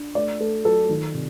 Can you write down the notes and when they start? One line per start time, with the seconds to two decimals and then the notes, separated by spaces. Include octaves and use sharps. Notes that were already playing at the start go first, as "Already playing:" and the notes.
Already playing: D4
0.15 A3 D5
0.40 A3 A4
0.65 F#3 A4
0.89 D#3
1.14 C3